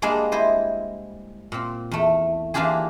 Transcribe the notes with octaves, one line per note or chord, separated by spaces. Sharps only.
G3 G#3 A#3 D4 G#4
E4 C5 D#5
A#2 C4
E2 A3
E3 A#3 D4 F4 G4 G#4